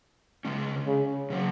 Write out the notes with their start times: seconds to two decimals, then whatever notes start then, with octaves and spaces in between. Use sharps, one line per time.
0.45 C#3 G#3 C#4
0.87 C#3
1.30 C#3 F#3 C#4